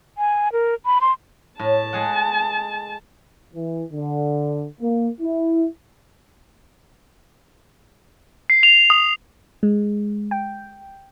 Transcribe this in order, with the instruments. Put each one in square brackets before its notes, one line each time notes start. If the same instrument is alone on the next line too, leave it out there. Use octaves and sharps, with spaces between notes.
[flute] G#5
A#4
B5
C6
[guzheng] A2 [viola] A5
[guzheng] G#3 G#4 F#5
[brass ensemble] E3
D3
A#3
E4
[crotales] C7
F7
D#6
[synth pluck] G#3
G5